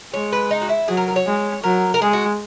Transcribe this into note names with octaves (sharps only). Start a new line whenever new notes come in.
G#3 C#5
B4
D#4
F#4
E4
F#3 G#4
A#4
A#4
C#5
G#3
F#3 A#4
A#4
G#3 G#4
F#4